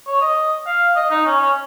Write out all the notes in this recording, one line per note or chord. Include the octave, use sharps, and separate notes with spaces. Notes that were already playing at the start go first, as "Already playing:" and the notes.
C#5
D#5
F5
D#5
D#4
C#4
C#4